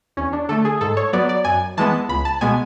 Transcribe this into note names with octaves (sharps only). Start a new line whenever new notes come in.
E2 C#4
D4
D3 A3 A4
G#4
G#2 A4
C#5
F#3 B3 D5
D5
F#2 G#5
E3 G#3 B3 A5
C#2 B5
A5
B2 G#3 B3 G#5